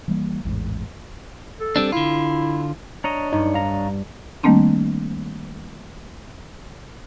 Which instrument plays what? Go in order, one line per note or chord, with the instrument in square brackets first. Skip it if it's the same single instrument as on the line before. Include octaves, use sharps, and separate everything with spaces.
[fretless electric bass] E3 G3 A#3
A1 E2 G#2
[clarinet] A4
[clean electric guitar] G3 C4 D4
[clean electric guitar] D3 F4 [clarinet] E4
[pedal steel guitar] D4 C#5 D#5 [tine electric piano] A#5
[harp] G2 [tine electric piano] D#4
[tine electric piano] F5 A#5
[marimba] D#3 G3 A3 A#3 C4 D4